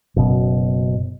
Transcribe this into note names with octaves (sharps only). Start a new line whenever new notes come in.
F#1 B2